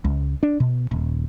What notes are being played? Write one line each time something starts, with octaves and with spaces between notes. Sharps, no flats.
C#2
D4
B2
D#1